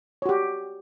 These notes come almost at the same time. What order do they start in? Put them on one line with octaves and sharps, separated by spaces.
C#5 F#4 G4